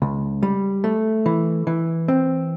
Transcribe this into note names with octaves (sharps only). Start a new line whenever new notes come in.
C#2
G3
A3
E3
E3
C4